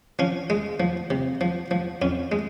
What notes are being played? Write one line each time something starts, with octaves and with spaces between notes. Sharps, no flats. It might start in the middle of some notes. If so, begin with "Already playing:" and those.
F3 C#4
G#3
F3
C3
F3
F3
F2 C#4
G#3